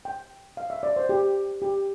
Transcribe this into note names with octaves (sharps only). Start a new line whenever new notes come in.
G5
F5
E5
D5
C5
G4
G4